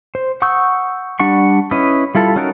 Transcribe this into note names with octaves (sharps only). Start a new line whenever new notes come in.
C5
F#5 C#6 D#6 E6 G6
G3 D4 F#5 C#6
C#4 E4 B4 D#5
G3 E4 F4 A4
C#4 D#4 F#4 A4 A#4